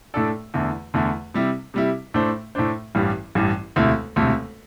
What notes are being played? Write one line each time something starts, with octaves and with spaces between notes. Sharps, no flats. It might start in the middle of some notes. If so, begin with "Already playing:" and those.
A2 A3 D4 A4 D5
E2 D3 A3 E4
E2 D3 A3 E4
C3 G3 E4
C3 G3 E4
A2 A3 D4 C5
A2 A3 D4 C5
A1 G2 E3 G3
A1 G2 E3 G3
E1 D2 C3 A3 E4
E1 D2 C3 A3 E4